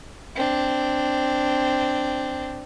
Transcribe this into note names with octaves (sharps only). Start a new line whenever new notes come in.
C4 D4